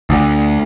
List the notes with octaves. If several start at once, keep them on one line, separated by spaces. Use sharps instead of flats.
D2